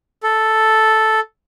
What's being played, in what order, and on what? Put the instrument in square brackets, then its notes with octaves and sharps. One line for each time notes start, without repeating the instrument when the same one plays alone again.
[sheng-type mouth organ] A4